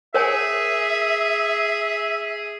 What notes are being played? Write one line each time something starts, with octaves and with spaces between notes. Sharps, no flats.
G#4 A#4 C#5 E5 G#5